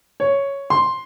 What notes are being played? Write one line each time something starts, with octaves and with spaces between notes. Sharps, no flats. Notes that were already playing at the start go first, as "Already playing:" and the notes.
C#5
C6